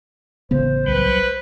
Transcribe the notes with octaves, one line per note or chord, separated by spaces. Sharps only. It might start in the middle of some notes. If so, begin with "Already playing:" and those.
A1 C#3 B3 C5
C2 F#3 G3 B4